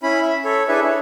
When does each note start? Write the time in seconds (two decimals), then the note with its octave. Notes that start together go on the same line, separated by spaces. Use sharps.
0.03 C#4 E4 B5
0.22 E5
0.45 A4 C#5
0.68 D4 E4 G#4 B4 E5
0.86 C#5